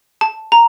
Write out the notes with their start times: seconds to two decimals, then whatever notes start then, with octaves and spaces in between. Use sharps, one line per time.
0.21 A5
0.52 A#5